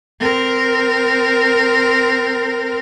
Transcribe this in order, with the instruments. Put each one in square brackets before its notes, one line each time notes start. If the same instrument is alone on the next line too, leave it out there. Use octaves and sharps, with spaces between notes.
[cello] C4 A#4